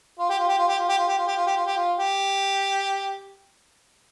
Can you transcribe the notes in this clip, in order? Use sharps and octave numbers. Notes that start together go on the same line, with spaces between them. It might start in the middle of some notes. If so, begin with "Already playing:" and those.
F4
G4
F4
G4
F4
G4
F4
G4
F4
G4
F4
G4
F4
G4
F4
G4
F4
G4